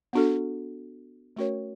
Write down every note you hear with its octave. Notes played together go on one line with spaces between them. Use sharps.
B3 D4 F#4 A4
A3 C#4 F#4 A#4 C#5